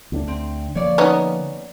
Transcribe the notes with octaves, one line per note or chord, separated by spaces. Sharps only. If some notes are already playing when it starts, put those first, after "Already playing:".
D2 B3 D4
C4
D3 F3 A#3 C#5 D5
B3 C#4 D#4